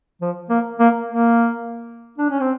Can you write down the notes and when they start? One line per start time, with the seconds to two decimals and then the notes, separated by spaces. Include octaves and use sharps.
0.21 F3
0.50 A#3
0.79 A#3
1.08 A#3
2.18 D4
2.30 C#4
2.40 C4